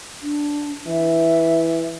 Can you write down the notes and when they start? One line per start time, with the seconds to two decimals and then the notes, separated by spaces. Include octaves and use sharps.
0.22 D4
0.87 E3 E5